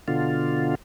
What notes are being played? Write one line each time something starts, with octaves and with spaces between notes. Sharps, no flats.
B2 D3 F4